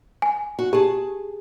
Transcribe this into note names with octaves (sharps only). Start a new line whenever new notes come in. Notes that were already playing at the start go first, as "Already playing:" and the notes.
G#5
F#4
G4 G#4 A5